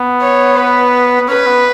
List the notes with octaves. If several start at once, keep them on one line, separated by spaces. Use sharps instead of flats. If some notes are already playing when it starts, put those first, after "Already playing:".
Already playing: B3
C#5
B4
B3
C#4 B4
B3